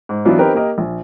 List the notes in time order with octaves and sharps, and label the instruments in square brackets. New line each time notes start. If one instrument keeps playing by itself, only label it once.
[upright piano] G#2
E3 F#3 B3 D4 F4
C4 D#4 G4 A#4 B4
A#3 G4 A#4 D#5
A#1